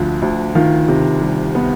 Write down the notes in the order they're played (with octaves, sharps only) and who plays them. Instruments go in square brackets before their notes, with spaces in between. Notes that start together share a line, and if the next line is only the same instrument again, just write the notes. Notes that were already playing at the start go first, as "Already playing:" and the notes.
Already playing: [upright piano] D2 D3 F3
D2
D#3 F4
C3
G3
B3